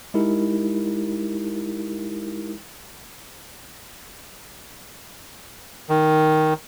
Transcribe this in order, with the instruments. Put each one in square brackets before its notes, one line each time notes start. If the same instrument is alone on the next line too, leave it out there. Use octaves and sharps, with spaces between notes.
[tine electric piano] G#3 D#4 E4 G4 A#4
[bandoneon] D#3